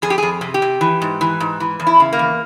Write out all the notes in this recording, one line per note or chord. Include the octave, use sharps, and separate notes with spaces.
F2 G#4
G4
F2 G#4
C3
G4
C3
E3
G#2
E3
G#2
E3
E2
E4
C#3
A#3
E2